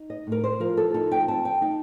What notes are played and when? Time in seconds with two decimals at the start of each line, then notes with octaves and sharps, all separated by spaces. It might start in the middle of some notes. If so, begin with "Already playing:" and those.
Already playing: D#4
0.10 D#5
0.27 A2
0.32 A#4
0.44 C5
0.60 F3 A#4
0.77 A4
0.94 D#4 A4
1.11 G5
1.28 C4 A5
1.45 G5
1.62 D#4 G5